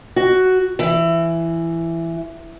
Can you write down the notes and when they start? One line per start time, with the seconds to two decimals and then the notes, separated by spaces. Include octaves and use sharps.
0.16 F#4
0.79 E3